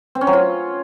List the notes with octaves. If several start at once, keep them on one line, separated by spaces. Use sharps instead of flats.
C4
C#4
F#3
F4